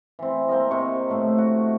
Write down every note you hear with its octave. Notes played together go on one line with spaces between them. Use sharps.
E3 C4
A#3 C4 A#4 D#5
C3 C#6
A2 A3
F#4